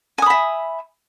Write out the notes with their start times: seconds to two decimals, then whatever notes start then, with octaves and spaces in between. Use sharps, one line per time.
0.18 G#5
0.22 D#6
0.26 B5
0.30 E5